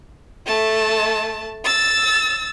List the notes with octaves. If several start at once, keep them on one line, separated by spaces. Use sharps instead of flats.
A3 A5
E6 A6